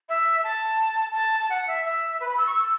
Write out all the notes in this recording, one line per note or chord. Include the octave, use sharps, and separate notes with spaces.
E5
A5
A5
F#5
E5
E5
B4
B5
E6
C#6
E6